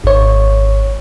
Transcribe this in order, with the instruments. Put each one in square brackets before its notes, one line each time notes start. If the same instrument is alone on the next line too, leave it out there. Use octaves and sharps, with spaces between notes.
[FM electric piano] G#1 C#5